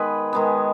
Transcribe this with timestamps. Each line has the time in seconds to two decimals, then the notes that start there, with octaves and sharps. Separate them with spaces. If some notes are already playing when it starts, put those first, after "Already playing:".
Already playing: D#3 G#3 B3 G#4 B4
0.33 D#3 G#3 B3